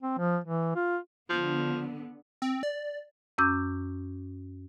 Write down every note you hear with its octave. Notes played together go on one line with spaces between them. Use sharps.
C4
F3
E3
F4
D3 F3 B3
C4
D5
F#2 C#4 D6 E6 G6